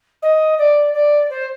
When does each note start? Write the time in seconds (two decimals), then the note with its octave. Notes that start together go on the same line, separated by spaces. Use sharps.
0.22 D#5
0.58 D5
0.94 D5
1.30 C5